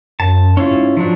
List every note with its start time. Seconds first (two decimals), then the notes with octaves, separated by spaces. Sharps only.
0.20 F#2 A5
0.57 C#4 E4 F4
0.71 G#2
0.97 F3 F#3 D4